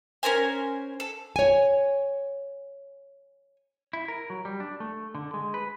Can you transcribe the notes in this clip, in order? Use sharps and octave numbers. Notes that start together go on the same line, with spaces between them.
C#4 A#4 C5 G#5
A4
C#5 G#5
E4
A#4
F#3
G3
D4
A3
D3
G#3
B4